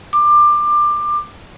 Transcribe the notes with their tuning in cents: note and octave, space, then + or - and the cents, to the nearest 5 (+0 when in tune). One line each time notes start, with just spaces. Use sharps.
D6 +20